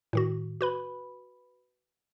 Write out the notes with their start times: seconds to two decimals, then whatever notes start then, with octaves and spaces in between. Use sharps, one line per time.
0.13 A2 D#3 F#4
0.61 F#4 B4 B5